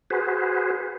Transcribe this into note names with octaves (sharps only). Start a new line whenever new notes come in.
F#4 G#4 B4 C5